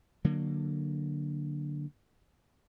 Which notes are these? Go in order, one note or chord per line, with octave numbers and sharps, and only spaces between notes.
D3 F#3 A#3